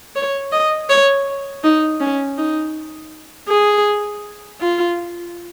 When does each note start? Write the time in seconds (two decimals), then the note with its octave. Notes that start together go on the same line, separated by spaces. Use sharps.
0.16 C#5
0.52 D#5
0.89 C#5
1.64 D#4
2.00 C#4
2.38 D#4
3.49 G#4
4.60 F4